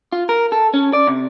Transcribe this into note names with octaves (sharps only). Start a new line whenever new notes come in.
F4
A#4
A4
C#4
D5
C3